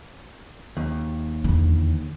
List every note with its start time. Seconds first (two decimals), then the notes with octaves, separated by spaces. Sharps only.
0.77 D#2
1.44 E2 D3